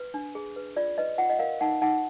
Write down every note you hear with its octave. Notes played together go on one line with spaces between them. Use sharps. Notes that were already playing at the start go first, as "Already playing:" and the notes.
Already playing: B4
D4
G#4
B4
F4 D5
B4 D#5
F4 F#5
D#5
A#4 F5
D#4 F#5
D#4 F#5